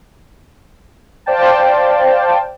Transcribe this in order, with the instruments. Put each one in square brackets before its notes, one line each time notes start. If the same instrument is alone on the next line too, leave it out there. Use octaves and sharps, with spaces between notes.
[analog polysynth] C5 D5 F5 G5 A5